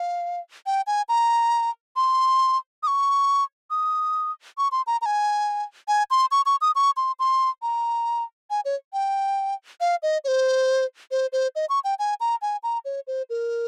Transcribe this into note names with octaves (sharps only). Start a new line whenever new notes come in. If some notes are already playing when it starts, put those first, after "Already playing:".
Already playing: F5
G5
G#5
A#5
C6
D#6
C#6
D#6
C#6
C6
A#5
A#5
G#5
G#5
C6
C#6
C#6
D#6
C#6
C6
C6
A#5
G#5
C#5
G5
F5
D#5
C#5
C5
C5
C5
D#5
C#6
G5
G#5
A#5
G#5
A#5
C#5
C5
A#4